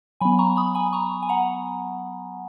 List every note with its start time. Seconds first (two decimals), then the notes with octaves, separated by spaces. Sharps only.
0.20 F#3 B3 G#5 B5
0.39 A#5 C#6
0.57 B5 D#6
0.75 G#5 B5
0.93 A#5 C#6
1.22 G#5
1.29 F#5 A#5